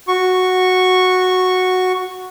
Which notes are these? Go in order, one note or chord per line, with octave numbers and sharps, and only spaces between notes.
F#4 C#6